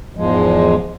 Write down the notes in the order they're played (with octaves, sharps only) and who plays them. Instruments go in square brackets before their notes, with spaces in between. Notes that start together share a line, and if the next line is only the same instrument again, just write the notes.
[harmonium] E2 G#2 F3 G#3